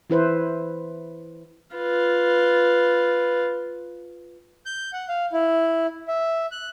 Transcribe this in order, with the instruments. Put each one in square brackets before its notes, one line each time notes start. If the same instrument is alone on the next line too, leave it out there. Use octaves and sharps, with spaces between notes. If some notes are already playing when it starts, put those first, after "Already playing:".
[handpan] E3 E4 B4 C5
[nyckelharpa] F4 B4
[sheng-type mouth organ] G6
F#5
F5
E4
E5
F#6